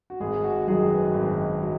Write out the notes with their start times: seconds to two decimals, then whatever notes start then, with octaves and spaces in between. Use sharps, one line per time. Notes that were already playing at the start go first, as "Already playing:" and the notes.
0.10 F#4
0.20 G#1 G#4
0.44 F#4
0.62 F#4
0.67 F#2 D#3 F#3 G#4
0.91 B4
1.14 G#1
1.63 F#3